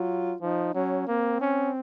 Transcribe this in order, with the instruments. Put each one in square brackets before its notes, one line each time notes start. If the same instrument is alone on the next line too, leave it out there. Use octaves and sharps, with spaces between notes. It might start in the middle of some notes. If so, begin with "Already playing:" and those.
Already playing: [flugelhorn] F#3 [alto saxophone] F4
[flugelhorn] F3 [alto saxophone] D#4
[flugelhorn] F#3 [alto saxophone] C#4
[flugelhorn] A#3 [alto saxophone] C4
[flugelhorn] C#4